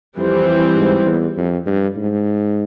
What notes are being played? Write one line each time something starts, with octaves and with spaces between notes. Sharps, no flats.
F2 E3 G3 C4
G#2
E2
F2
G2
G#2